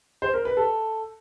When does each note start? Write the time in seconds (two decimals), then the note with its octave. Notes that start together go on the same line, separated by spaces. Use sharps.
0.22 C5
0.34 A#4
0.45 B4
0.57 A4